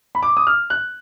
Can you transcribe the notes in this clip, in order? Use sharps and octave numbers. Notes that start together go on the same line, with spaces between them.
B5
D6
D#6
F6
F#6